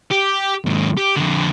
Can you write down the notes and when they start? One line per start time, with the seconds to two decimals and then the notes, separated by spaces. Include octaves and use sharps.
0.11 G4
0.65 D#2 G#2
0.97 G4
1.16 F2 D3